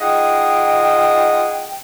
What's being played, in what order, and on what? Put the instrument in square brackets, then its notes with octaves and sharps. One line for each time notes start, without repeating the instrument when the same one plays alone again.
[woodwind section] D#4 F4 G#4 D#5 F#5 G5